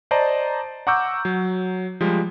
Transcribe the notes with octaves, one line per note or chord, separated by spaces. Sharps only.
C5 D5 D#5 A5 A#5
F#5 A#5 C#6 D6 E6 G6
F#3
F3 G3 G#3